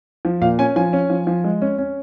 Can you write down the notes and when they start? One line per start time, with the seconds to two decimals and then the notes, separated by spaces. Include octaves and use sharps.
0.25 F3
0.41 A#2 F5
0.59 C#4 G#5
0.76 F3 G#5
0.93 C#4
1.10 F3
1.27 F3
1.44 G#3
1.62 C#4
1.78 C#4